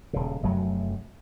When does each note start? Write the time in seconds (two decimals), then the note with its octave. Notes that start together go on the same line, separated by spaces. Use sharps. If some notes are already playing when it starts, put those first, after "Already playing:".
0.13 D#1 C#3
0.43 F1 F#2 F#3 A3